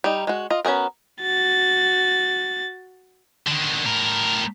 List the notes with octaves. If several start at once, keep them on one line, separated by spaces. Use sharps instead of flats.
G3 D#4
G#3 F#4
F4 D#5
B3 C#4 F#4 G#4 A#4
F#4 A6
D3 D#3
A2 A#4